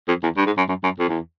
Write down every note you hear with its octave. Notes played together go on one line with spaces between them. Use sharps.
F2
E2
G2
G#2
F#2
F#2
F#2
F2
E2